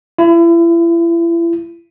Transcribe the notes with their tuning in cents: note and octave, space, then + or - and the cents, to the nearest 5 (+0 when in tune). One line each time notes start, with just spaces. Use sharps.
E4 +35